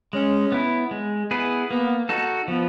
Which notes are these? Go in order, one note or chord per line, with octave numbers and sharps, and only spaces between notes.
G#3 C#4
B3 E4
G#3
B3 E4 G#4 B4
A#3 B3
D#4 F#4 A4
F3 B3